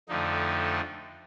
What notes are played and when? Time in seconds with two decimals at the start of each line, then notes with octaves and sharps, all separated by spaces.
0.09 F2 D3 F3 A3 D#4